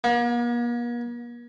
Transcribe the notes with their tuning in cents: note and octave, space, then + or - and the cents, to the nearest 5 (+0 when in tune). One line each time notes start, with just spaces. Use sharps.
A#3 +45